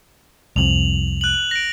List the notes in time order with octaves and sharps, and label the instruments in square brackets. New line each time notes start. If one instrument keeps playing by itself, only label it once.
[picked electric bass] C2 F2 [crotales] F7 F#7
[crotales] F#6 F#7
A#6 D7